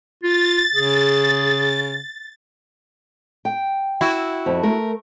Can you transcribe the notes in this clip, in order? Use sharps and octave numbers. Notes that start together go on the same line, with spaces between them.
F4 A6
C#3 G#4
G5
E4 F#4
F2
A3 A#4